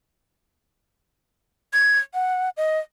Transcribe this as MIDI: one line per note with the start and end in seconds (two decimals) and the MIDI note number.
1.73 1.99 92
2.14 2.49 78
2.57 2.79 75